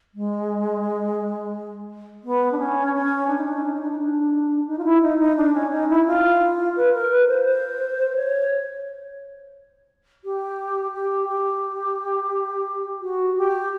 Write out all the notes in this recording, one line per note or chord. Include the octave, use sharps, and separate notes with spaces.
G#3
B3
D4
C#4
C#4
D4
D#4
D4
D#4
D4
D#4
D4
D#4
D4
D#4
F4
E4
D#4
D#4
D4
C#4
D#4
E4
F4
B4
A#4
B4
C5
C5
C5
C#5
G4
G4
G4
F#4
G4